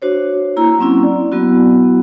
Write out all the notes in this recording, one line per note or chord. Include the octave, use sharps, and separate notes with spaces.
D4 F#4 C5 C#5
A#3 E4 A#5
F#3 A#3 C4 C#4 E4
D5
F#3 B3 E4 F#4